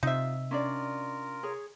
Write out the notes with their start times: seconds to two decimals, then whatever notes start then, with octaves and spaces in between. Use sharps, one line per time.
0.03 C3 D#4 F4 E5
0.51 C#4 D4 F4 A#4 D5
1.43 G#4 C#5